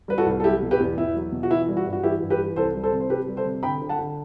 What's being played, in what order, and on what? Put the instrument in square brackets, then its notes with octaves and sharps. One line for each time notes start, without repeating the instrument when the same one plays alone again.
[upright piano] G3 B4
F#4 A4
C2
A4
F#3 E4 G4
B2
G4 B4
E2
E2 E4
F#3
B2
F#4
E3 E4
G3
F#4
G2
F#4
E3 E4 G4
G2
G4 B4
E3
C2 A4 C5
G3
A4 C5
C3
C5
C3 G4 B4
G3
A4 C5
C3
D3 G5 B5
D3
F#5 A5
D3